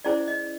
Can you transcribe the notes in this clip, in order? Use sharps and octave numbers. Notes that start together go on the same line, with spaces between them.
C#4 E4 G#4 C5 D5
D#5